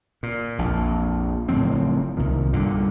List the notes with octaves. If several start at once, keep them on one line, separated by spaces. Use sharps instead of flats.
A#2
A#1 F2
F#1 A2 F3 C4
C2 A#2 D#3
G2 A#2 D3